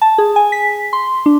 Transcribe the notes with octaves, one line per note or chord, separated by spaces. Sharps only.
A5
G#4
G#5
B6
C6
D4